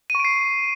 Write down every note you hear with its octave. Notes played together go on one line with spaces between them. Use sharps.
C#6 C7 D7 D#7